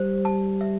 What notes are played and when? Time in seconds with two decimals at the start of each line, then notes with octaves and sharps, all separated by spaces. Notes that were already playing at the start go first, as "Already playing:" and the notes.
Already playing: G3 C5
0.25 A5
0.61 E5